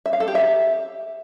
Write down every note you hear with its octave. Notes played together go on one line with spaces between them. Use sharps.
E5
F5
A4
G4
E5